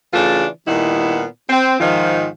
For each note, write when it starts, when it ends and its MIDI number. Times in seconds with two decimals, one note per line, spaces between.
0.14 0.47 49
0.14 0.47 52
0.14 0.47 57
0.14 0.47 62
0.14 0.47 65
0.67 1.25 46
0.67 1.25 51
0.67 1.25 55
0.67 1.25 59
0.67 1.25 64
1.49 1.76 60
1.80 2.28 44
1.80 2.28 51
1.80 2.28 53